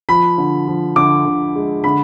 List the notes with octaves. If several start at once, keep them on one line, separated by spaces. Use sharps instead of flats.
F3 B5
D3
F3
D3 D6
D3
G#3
D3 B5